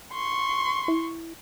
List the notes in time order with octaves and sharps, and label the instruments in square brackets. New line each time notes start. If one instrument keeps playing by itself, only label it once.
[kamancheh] C6 C#6
[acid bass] E4